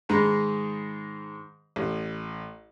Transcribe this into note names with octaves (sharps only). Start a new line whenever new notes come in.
G#2 D#3 G#3 A#5 B5
A1